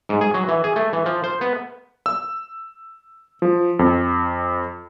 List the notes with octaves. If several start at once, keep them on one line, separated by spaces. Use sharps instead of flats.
G#2
G#4
F#3
E3
G#4
A3
E3
F3
C5
B3
E6
F3
F2